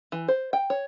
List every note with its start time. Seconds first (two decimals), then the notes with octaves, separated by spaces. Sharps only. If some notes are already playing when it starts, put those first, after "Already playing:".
0.12 E3
0.28 C5
0.53 G5
0.70 C#5